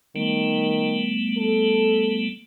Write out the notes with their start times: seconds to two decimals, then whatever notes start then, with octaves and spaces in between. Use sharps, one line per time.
0.16 D#3 G3 A3 B3
1.37 A4